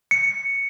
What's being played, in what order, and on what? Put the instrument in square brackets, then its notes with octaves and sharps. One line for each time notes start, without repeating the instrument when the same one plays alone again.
[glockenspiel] C#7